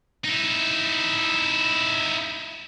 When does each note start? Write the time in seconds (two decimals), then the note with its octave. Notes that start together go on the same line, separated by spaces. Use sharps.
0.25 D#4 E4